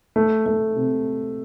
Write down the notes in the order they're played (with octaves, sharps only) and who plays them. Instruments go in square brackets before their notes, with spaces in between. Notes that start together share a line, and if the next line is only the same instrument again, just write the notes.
[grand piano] A3
A3
C3